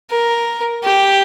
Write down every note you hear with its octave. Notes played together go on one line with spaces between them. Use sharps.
A#4
G4